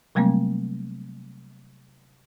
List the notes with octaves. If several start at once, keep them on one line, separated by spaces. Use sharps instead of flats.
C3 F#3 G3 A3 A#3 C4